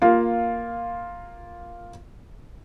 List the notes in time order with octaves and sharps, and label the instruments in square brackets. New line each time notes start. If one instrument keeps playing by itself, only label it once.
[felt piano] A#3 F4